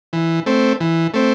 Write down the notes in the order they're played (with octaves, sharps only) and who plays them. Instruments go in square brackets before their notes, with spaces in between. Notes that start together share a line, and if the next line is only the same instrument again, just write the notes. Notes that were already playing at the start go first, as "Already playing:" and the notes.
[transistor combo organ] E3
A3 C4
E3
A3 C4